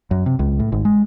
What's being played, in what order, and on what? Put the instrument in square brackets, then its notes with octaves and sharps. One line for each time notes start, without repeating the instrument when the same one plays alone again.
[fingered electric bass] F#2
C3
C#2
A2
G#1
G#3